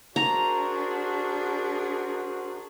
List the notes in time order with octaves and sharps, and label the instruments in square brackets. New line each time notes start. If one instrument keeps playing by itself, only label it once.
[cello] D4 G#4 [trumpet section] F#4 A#4 C5 [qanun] A#5